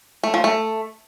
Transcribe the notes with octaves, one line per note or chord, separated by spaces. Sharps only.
A3
F3
A3